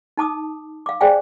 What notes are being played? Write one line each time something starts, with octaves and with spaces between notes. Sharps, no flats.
D#4 A5 D6 D#6
F5 D6
G#4 C5 D5 F5 G5 G#5